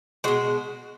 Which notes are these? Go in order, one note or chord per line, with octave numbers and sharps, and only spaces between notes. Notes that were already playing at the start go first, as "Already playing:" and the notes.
B2 G#3 F#4